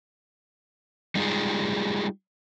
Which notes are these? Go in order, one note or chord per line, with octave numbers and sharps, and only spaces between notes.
G3 G#3 D#4 F4 G4 G#4